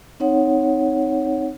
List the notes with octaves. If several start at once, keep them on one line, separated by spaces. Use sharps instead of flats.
C4 D#4 C#5 F#5